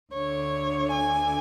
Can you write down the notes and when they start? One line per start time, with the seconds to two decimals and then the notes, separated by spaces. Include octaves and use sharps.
0.12 D2 D3 C#5
0.91 G#5